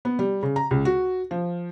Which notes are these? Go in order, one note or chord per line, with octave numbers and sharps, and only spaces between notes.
B3
G3
C#3
A#5
C#2
F#4
F3